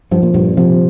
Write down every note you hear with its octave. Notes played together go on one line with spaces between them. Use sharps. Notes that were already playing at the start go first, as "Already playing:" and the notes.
G2 F3
A#2
G2 A#2
C3 F3